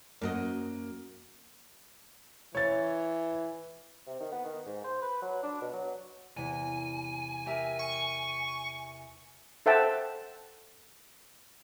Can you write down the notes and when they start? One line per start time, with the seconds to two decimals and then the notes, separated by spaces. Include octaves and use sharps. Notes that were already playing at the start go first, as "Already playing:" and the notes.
0.22 F#2 A#3 F#4 D#5
2.55 E3 C#5 A6
4.07 C3
4.20 D#3
4.32 B3
4.45 D#3
4.66 G#2
4.84 C5
5.02 B4
5.22 F#3
5.43 D4
5.62 B2
5.73 F#3
6.37 E2 C3 G#5
7.46 G4 A#4 E5
7.79 C#6
9.66 A4 C5 E5 F#5 G5 A5